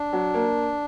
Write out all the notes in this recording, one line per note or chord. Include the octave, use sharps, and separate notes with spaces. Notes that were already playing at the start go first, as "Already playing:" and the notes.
Already playing: D4
F#3
A#3